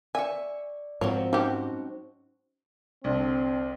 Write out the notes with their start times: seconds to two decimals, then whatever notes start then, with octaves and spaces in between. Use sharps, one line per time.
0.15 D5 E5 G#5 C#6
1.01 G#2 F3 F#3 C4 C#5
1.33 G3 C#4 D#4 F#4 G4 C5
3.04 C2 D3 C4